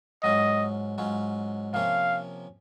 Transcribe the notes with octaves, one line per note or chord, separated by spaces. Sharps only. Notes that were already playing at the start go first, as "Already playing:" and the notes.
G#2 F#3 C#4 F4 D#5
G#2 F#3 C#4 F4
C3 F3 A#3 C#4 F4 F5